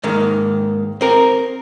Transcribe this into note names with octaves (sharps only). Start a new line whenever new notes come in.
G#2 D#3 A#3
C4 A#4